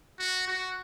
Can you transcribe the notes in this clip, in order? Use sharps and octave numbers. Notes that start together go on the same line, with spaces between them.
F#4
F#4